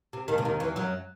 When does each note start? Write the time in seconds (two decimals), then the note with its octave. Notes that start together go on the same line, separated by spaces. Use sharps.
0.13 C3
0.28 D#2 D#3
0.38 C3
0.45 D#2 D#3
0.60 E2 E3
0.76 F#2 F#3